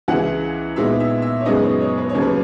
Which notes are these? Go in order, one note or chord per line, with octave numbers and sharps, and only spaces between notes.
C#2 C#3 E3 F#5
A#2 G#3 B3 D#4 E5
E5
E5
C#5
F#2 C#3 G#3 B3 D#4 D#5
C#5
C#5
B4
C#5
D#2 C#3 F#3 A#3 C#4
B4